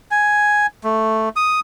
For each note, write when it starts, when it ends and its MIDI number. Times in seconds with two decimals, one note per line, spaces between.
0.11 0.67 80
0.84 1.29 57
1.36 1.60 87